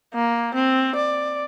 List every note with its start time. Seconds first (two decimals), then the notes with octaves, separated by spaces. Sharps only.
0.14 A#3
0.54 C4
0.96 D5